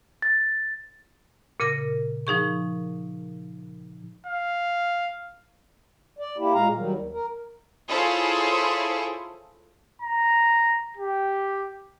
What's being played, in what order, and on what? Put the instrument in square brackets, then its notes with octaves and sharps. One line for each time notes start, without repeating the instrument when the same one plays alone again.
[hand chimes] A6
[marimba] A#2 C#3 A#4 A#6
F3 D#4 G#4 C#6
[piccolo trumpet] F5
[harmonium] D5
A#3 E4 G4
A#2 G#3 F5 A#5
D#3 F#3 G3
D#2
A#4
[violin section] E4 F4 G#4 A4 C5 C#5
[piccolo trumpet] A#5
G4